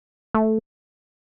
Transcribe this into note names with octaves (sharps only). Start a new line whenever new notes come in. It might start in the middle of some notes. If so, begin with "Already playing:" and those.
A3